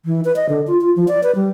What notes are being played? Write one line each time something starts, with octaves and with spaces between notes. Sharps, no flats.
E3
B4
D#5
D3
F4
F4
F3
D5
B4
G3